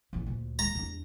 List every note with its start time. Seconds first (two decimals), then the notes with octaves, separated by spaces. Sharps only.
0.13 A1 E2
0.26 D2 A#2
0.59 A#5
0.75 E2 D4